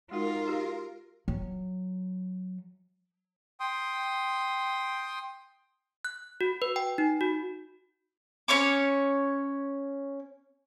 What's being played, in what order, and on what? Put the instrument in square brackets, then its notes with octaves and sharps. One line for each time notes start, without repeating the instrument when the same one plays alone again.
[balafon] G#3 F#4 F5 [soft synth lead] D#4 [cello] F4 [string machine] A#4
[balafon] F#4 G4
[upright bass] F#3
[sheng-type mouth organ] G5 C6 D#6
[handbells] F#6
F#4
B4
G5
D#4
F#4
[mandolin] C#4 C#5 C#6 D6